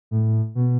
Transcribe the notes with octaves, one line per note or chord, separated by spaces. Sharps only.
A2
B2